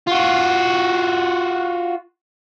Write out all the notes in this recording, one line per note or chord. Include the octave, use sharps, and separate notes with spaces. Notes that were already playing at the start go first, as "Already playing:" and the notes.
F4 F#4